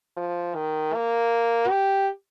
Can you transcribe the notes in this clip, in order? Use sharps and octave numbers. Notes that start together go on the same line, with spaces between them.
F3
D#3
A#3
G4